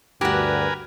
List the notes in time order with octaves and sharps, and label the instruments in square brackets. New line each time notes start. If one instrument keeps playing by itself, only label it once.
[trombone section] D2 G2 [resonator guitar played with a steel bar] F#4 G4 [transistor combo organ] A#4 B4 G#5